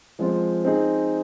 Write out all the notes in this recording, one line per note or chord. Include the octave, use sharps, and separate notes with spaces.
F3 G#3 C4 F4 C5
C4 D#4 G#4